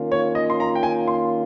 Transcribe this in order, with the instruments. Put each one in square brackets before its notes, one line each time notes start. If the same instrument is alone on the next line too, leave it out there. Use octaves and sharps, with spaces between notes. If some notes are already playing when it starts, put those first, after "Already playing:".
Already playing: [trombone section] D#3 A#3 C#4 F4
[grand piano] C#5
D#5
C6
A#5
G5
G#5
C6